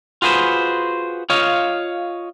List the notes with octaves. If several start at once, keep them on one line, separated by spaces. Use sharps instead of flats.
F4 F#4 G#4 B4 C5
F4 C#5 D#5 F5